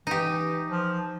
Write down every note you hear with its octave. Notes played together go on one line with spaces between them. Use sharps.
E3 D#4 G4
F3